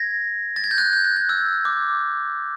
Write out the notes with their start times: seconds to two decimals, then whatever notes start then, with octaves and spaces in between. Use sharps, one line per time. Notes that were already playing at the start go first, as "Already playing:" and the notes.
Already playing: G#6 A#6
0.56 A6
0.64 G#6
0.71 G6
0.78 F#6 G#6
0.93 G6
1.04 F#6
1.16 F#6
1.29 E6
1.65 D6